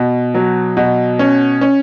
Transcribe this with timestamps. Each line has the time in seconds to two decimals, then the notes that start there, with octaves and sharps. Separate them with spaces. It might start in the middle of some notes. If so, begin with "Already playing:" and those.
Already playing: B2
0.34 F#3
0.77 B2
1.19 C#4
1.61 C#4